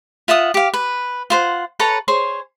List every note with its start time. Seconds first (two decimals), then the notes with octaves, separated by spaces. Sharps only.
0.28 F4 E5 F#5 D#6
0.54 G4 F5
0.74 B4
1.30 F4 C5 F#5
1.79 A4 B4 C#5 A#5
2.08 G#4 C5 C#5